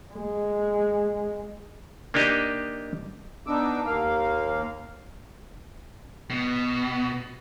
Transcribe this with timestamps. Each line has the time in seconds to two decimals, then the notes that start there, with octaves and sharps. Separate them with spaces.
0.13 G#3
2.14 A#3 D4 D#4 G4 D#5
3.47 B3 D4 D#4 D6 E6
3.86 D#2 A#3 F5
6.30 B2